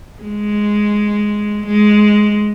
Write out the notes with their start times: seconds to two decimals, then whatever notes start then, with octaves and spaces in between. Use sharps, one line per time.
0.22 G#3
1.67 G#3